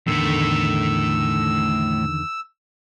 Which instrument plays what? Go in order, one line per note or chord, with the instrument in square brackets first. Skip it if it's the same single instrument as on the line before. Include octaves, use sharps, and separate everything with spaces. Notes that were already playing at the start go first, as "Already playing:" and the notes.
[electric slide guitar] E2 D3 D#3 [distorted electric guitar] A2 A3 [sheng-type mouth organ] E6